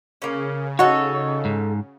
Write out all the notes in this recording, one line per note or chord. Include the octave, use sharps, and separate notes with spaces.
C#3 A#3 C#4
D#4 F#4 A4 C#5
G#2